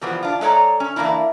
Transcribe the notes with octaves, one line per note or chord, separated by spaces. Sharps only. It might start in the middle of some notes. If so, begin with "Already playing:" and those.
B2 E3 F3 G3 B3
D4 F4
G#3 A4 C#5 D5 A#5
C#4
E3 F3 A#3 D4 E4